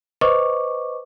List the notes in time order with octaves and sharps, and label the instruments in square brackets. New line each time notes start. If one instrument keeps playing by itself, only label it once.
[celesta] B4 C5 D#5 C#6 D6